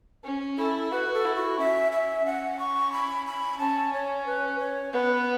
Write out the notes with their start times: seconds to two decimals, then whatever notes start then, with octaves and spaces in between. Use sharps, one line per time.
0.24 C#4
0.58 E4 A4
0.92 F#4 B4
1.14 A4
1.25 E4
1.36 F#4
1.58 C#4 E5
1.92 E5
2.26 C#4 F#5
2.59 C#6
2.93 B5
3.26 B5
3.59 C#4 A5
3.93 C#5
4.26 B4
4.59 C#5
4.93 B3 B4